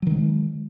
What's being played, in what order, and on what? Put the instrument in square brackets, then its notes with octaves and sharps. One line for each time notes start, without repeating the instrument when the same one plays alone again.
[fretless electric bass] F#3
D#3
G#3